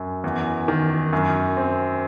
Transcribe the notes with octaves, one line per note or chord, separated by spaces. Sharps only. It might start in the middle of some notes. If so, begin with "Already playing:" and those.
Already playing: F#2
E2
D#3
F#2
C4